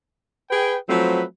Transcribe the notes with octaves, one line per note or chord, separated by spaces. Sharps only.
G#4 B4 G5
F3 F#3 A3 C4 B4